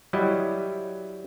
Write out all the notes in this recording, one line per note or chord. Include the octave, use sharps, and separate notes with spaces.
F#3 G3 E4 D#5